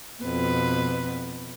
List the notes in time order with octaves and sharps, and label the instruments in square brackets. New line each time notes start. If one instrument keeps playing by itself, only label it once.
[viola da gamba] F2 B2 B4